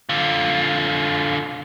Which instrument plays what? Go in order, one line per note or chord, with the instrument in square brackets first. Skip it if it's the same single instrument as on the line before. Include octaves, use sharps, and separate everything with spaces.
[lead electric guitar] D3 F4